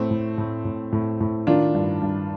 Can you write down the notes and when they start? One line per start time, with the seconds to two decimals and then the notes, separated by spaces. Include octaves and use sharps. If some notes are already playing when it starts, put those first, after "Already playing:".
Already playing: A2 A3 C4
0.11 A2
0.38 A2
0.65 A2
0.93 A2
1.20 A2
1.47 D#3 D4 F4
1.75 G2
2.02 G2